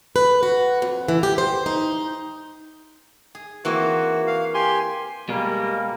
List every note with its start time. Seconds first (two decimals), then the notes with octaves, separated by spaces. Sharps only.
0.16 B4
0.43 F#4
0.82 F2
1.08 E3
1.23 G4
1.38 C5
1.66 D#4
3.35 G#4
3.65 E3 A#3 C4 F#4
4.27 F5
4.54 G4 G#5 C6
5.29 B2 G3 G#3 A#3